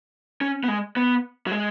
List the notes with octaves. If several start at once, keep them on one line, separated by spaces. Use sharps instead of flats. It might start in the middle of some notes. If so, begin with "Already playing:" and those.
C#4
B3
G#3
B3
F#3
G#3